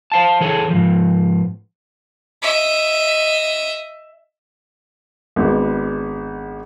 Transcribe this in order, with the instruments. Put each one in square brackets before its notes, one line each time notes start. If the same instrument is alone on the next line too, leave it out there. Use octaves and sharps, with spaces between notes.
[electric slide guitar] C5 F5 A5
E3 G#4 A4 C#5
G#2 F3
[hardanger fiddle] D#5 E5
[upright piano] G#1 G#3 B3 D4